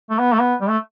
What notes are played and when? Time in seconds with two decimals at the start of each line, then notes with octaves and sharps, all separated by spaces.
0.10 A3
0.19 B3
0.33 A3
0.40 B3
0.61 G3
0.69 A3